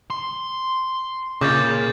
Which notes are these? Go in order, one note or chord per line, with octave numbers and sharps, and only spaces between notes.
C6
A#2 C#3 D6 G6 A6